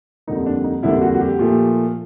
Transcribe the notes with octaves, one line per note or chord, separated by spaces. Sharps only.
F2 D3 G3 A#3 D#4
D4
D#4
F2 D3 G3 A#3 E4
F#4
F#4
G4
A#2 F3 A3